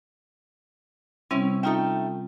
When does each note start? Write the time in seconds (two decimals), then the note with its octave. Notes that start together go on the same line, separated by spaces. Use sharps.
1.31 C3 G3 C4 C#4 E4
1.63 A3 C#4 D#4 F4 G5